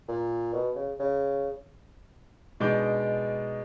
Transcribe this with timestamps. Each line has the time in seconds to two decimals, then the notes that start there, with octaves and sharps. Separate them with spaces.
0.08 A#2
0.53 B2
0.76 C#3
1.00 C#3
2.60 B2 G#3 D4 D#4 D6 G6